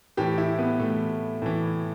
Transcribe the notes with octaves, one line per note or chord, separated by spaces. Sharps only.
A2 E3 G4
E4
B3
A2 E3 A3
A2 E3